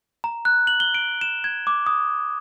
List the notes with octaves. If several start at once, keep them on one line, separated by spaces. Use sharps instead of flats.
A#5
F#6
F#7
G7
D7
E7
G#6
D6
D#6